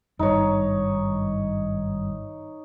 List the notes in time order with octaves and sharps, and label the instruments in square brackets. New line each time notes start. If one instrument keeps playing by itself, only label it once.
[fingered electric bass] G#1 G2 [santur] D#4 C#5